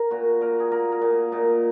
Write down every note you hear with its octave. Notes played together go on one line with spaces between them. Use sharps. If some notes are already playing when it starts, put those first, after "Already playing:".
Already playing: A#4
A#2 F#4
A#2 A#4
G#4
A#3 A#4
A#4
A#2 G#4
A#2 D#4